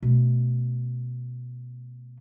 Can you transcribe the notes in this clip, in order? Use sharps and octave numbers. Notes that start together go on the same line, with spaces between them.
B2 A3